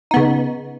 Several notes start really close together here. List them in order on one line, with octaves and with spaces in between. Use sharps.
D#4 B3 C#3